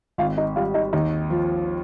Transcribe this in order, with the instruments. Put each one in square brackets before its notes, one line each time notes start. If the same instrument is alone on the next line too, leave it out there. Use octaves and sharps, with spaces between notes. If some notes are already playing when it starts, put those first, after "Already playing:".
[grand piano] G#1 [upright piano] F4 F5
[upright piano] D#4 D#5
[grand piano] G3 [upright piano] F4 F5
[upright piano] D#4 D#5
[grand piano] D#2 [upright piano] D#4 D#5
[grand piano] F3